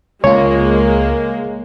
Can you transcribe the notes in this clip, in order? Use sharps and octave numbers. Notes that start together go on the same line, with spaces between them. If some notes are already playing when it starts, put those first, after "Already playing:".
C#2 G#3 A#3 F4 C#5